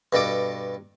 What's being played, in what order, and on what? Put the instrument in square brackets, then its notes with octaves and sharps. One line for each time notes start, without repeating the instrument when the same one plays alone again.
[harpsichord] G2 B2 A4 D6